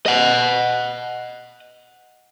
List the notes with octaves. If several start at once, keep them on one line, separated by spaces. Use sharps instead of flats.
D#5 F#5